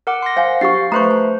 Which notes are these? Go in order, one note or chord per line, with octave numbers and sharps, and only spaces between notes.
A#4 F#5 D6
C6 A#6
C5 F5 F#5 G#5
D4 G4 F5 C#6 A6 C7
A3 B4 C5 A#5 C6 C#6
A5